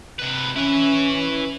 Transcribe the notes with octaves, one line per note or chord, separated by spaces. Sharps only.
C3 B4
C#4 E4 B4